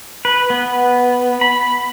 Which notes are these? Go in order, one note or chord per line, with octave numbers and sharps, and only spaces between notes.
B4
B3
B5